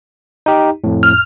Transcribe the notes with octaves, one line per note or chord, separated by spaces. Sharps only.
D#4 G4
F2 A2
F6